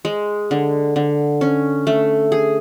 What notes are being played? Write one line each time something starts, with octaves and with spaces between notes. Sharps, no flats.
G#3
D3
D3
C#4
A3
G#4